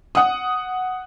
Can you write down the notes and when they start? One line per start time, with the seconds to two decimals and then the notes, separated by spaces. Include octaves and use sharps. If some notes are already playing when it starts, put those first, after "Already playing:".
0.15 F#5 D#6